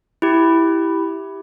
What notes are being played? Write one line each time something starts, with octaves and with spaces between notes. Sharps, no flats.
E4 G4